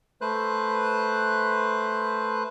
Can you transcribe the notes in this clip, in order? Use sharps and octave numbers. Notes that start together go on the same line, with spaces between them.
A3 B4 C5 F#6